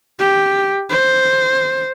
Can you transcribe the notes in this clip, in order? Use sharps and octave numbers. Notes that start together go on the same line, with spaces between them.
G4
C5